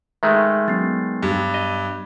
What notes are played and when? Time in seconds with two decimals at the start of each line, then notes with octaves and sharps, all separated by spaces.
0.23 D#3 G#3 A3 E5
0.68 F#3 B3 C#4 A6 C7
1.23 G2
1.54 D#5